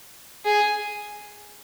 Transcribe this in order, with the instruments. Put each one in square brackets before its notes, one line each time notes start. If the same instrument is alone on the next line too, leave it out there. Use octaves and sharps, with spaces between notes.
[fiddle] G#4